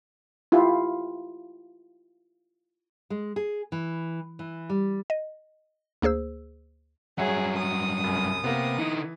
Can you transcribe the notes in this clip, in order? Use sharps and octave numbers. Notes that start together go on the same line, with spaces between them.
E4 F4 G4
G#3
G#4
E3
E3
G3
D#5
D2 A#3 G#4 C5 E6
G2 F#3 G#4 C#5 E5 F#5
D#6
C2 F#2
C3 A#3 B3
D3 E3 D#4